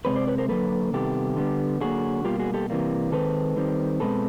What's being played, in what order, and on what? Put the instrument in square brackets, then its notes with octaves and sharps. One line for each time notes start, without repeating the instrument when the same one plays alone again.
[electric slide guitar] C3 E3 G#3 C4 B4 C#5
C5 D5
B4 C#5
A#4 C5
D3 F#3 A#3 A4 B4
C3 D#3 G3 B3 G4 A4
D3 G3 B3
D3 F#3 A#3 F#4 G#4
B2 G3 A#3 F4 G4
F#4 G#4
G4 A4
C3 E3 G3 A#3
D#3 G#3 C4 A4 B4
D#3 G3 C4
B2 G#3 C4 A4 B4